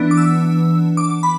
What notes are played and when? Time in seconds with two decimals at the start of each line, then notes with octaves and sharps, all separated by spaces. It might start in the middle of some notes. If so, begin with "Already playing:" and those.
Already playing: E3 B3 D4
0.11 D6
0.17 E6
0.97 D6
1.23 B5